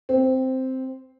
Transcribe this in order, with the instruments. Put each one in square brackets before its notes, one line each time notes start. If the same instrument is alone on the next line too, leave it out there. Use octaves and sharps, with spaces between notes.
[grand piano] C4